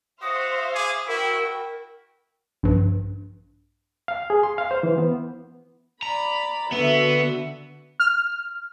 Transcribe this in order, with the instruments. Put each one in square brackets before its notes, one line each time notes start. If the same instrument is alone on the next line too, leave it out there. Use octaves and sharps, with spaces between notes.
[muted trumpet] F#4 [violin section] C5 E5 F5 [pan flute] D#6
[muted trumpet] G#4 [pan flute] D6
[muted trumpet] E4 [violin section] F#4 G5 [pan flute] A#4
[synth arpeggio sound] A#1 G2
[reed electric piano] F5
G#4
C6
F5
C5
E3
B3
[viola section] D5 B5 [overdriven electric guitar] A#5
[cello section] D3 [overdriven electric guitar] B3 [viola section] F#4 E5
[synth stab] F6